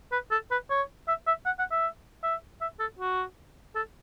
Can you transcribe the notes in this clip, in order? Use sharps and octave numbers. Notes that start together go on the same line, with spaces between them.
B4
A4
B4
C#5
E5
E5
F#5
F#5
E5
E5
E5
A4
F#4
A4